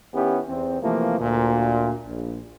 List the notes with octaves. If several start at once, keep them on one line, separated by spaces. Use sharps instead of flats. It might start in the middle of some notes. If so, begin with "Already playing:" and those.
D#3 B3 C#4 E4 G4
E2 C4
C3 E3 F3 A3 A#3
D2 A#2
A#1